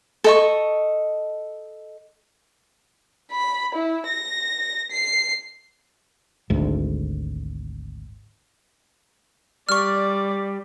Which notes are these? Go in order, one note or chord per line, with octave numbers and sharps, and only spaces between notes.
A4 D#5 C#6
B5
E4
A#6
C7
G#1 D2
G3 D5 C#6 F6